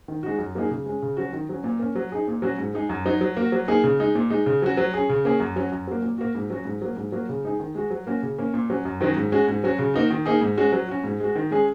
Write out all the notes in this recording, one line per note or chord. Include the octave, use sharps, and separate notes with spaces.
D#3
G#3 D#4 F#4
F#2
F#3 A#3 D#4 G#4
C#3
G#3 C#4
C#3
F#3 C#4 F#4
D#3
F#3 C#4
A#2
A#3 C#4
F#3
D#4 G#4
A#2
F#3 C#4 F#4
G#2
G#3 D#4 G#4
F#2
F#3 D#4
F#3
A#3 F#4
F#3
A#3 D#4 G#4
C#3
G#3 D#4
A#2
G#3 D#4
C#3
F#3 C#4 F#4
F#3
C#4 G#4
C#3
A#3 C#4 G#4
F#2
F#3 C#4 F#4
F#2
F#3 A#3
A#2
A#3 F#4
G#2
F#3 C#4 F#4
G#2
F#3 A#3
G#2
F#3 A#3 F#4
C#3
G#3 D#4 G#4
D#3
G#3 F#4
F#3
A#3 C#4 F#4
C#3
A#3 C#4
A#2
F#3 C#4
F#2
D#3 F#3 C#4 F#4
G#2
G#3 C#4 F#4
G#2
F#3 C#4 F#4
C#3
A#3 D#4 F#4
D#3
A#3 D#4 G#4
G#2
G#3 C#4 F#4
F#3
C#4 F#4
G#2
G#3 F#4
D#3
G#3 C#4 G#4